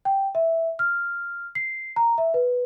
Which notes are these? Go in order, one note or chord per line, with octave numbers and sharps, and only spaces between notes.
G5
E5
F6
C7
A#5
E5
B4